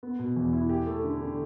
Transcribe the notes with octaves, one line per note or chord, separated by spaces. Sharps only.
B3
B2
E2
E4
G4
A3
D3
D3